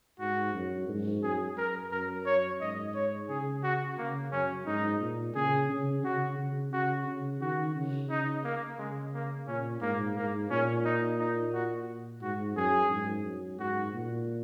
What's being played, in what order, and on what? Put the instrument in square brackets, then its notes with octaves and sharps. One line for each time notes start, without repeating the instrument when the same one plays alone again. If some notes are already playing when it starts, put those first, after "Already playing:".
[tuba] G#2 [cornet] F#4
[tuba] F#2
G#2
[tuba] F#2 [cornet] G#4
[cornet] A#4
[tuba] F#2 [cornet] A#4
[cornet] C#5
[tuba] G#2 [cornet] D#5
[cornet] C#5
[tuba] C#3 [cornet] G#4
[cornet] F#4
[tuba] C#3 [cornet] A#3
[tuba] F#2 [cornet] C#4
[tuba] G#2 [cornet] D#4
[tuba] A#2
[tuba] C#3 [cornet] G#4
[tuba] C#3
[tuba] C#3 [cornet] F#4
[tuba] C#3
[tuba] C#3 [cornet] F#4
[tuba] C#3
[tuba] D#3 [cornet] F#4
[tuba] C#3
[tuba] C#3 [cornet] D#4
[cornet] A#3
[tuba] C#3 [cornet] G#3
[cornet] A#3
[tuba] A#2 [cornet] C#4
[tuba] G#2 [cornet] A#3
[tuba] G#2 [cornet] A#3
[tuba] A#2 [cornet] C#4
[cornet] D#4
D#4
F#4
[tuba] G#2 [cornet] F#4
[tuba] F#2 [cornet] G#4
[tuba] G#2
F#2
[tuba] G#2 [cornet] F#4
[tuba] A#2